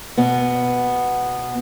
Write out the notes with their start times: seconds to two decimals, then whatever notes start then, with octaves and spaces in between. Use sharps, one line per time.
0.17 B2 B3